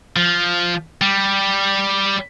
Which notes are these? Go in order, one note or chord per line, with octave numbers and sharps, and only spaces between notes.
F3
G3